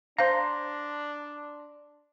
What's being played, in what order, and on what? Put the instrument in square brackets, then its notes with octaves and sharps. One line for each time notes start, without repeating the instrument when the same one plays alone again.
[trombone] D4 [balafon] C5 F5 [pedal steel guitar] A#5 C6